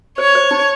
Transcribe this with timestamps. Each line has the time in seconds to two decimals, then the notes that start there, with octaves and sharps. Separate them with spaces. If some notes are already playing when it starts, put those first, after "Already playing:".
0.18 C5 C#5
0.35 C5
0.51 D#4